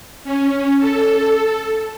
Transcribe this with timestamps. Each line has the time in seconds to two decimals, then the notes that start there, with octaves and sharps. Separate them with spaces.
0.24 C#4
0.79 A4